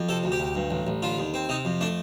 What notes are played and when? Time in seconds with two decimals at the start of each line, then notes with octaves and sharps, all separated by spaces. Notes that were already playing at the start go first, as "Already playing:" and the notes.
Already playing: F2
0.09 C3 A4
0.24 D2
0.32 G4
0.40 D2
0.55 G2
0.71 A1
0.87 A1
1.02 D3 F4
1.18 D#2
1.34 C4
1.49 C3 D#4
1.65 F2
1.81 A3 D4